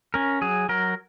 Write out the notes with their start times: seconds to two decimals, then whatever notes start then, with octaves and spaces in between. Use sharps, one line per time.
0.14 C#4 A#4
0.42 F#3 G#4
0.69 F#3 A#4